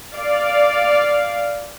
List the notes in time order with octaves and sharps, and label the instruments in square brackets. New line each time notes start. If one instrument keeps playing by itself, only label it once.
[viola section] D5 F5